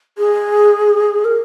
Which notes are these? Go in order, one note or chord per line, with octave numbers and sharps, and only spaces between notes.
G#4
A#4